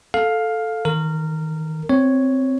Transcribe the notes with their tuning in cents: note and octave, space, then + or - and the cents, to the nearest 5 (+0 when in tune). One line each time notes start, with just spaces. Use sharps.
A4 +0 F5 +10
D#3 +25 A#4 -20
C4 +0 C#5 +0